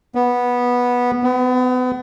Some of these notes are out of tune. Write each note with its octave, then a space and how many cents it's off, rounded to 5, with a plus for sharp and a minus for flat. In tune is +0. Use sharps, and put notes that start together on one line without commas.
B3 -10
B3 +35